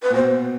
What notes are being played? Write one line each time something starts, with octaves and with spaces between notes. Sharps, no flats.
B4
A#2
B2 C5